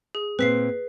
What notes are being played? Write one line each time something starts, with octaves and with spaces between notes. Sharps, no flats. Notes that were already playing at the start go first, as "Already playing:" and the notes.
G#4
A#2 C4 B4 B6 C7